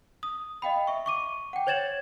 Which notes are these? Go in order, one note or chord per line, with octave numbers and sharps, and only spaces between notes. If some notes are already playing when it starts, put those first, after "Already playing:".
D#6
D#5 F5 G5 B5
E5 C#6
C#6 D6 D#7
F#5 G5
C5 C#5 G#6 A6 E7 F#7